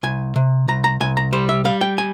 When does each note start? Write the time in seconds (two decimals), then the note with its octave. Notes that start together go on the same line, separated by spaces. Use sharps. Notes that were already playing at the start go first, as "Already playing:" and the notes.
0.03 C2 G#5
0.36 C3
0.68 C2 A#5
0.84 A#5
1.01 C2 G#5
1.17 A#5
1.33 G3 C5
1.49 E5
1.65 G3 F5
1.81 G5
1.98 G#5